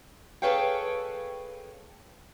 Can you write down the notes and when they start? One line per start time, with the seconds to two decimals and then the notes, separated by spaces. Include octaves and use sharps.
0.42 G#4 A4 B4 C#5 F5 G5